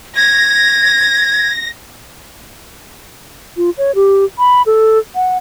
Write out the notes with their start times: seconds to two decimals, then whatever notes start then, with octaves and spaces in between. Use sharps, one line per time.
0.16 G#6 A#6
3.57 F4
3.78 C#5
3.95 G4
4.38 B5
4.66 A4
5.15 F#5